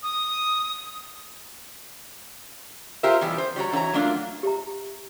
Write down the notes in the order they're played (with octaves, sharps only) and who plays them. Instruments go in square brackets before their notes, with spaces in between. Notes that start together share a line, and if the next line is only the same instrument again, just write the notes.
[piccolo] D#6
[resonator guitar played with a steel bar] F4 G4 A#4 C5 E5
B2 E3 G3 G4
C5
G3 F#4 C#5 A#5
E3 E4 F#4 C#5 A#5
F#3 A3 A#3 D4 F4
[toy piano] G4 E5 A#5